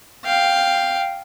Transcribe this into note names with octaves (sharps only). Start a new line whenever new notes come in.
F5 G5